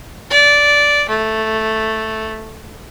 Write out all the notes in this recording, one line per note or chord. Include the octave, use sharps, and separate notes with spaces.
D5
A3